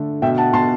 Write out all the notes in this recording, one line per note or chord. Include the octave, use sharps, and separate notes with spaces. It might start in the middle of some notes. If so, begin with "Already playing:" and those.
Already playing: D3 A3
B2 E5 G5
F#5 A5
B2 A5 C6